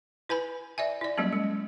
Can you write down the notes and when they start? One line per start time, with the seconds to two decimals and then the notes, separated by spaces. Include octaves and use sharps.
0.29 E4 B4 G#5 B5
0.78 D5 E5 G#5
1.01 E4 D5
1.18 F#3 G3 A#3 C#4
1.33 G#3